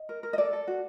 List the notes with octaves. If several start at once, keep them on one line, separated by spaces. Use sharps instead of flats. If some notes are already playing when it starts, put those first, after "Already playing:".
Already playing: D#5
A#4
A#4
D#5
A4 D5
A4
F#4